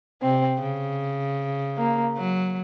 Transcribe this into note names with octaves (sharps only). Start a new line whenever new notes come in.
C3 C4
C#3
A#3
F#3